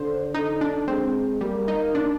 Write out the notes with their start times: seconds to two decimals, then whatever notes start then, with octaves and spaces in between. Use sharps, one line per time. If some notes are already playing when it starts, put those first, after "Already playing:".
Already playing: D3 C5
0.34 D3 D#4
0.61 D4
0.88 G#3 C4
1.41 G3 A#3
1.68 D#4
1.95 D4